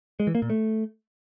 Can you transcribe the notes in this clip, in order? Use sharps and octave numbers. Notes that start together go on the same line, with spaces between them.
G#3
E3
A#3
A#2
A3